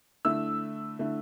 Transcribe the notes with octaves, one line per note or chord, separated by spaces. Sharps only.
D3 A3 E4 E6
D3 A3 E4